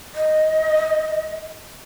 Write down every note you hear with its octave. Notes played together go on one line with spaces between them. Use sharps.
D#5